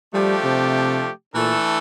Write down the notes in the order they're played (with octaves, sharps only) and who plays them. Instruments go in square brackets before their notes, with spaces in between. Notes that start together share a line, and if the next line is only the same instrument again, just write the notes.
[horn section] F3 A3 D4 G4 [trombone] G3
[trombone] C3
[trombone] A#2 [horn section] E3 A3 D4 A4